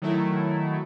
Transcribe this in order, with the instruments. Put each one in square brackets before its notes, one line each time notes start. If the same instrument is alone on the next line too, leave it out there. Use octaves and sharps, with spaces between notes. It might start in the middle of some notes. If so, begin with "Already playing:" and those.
[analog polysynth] D#3 F#3 A3 E4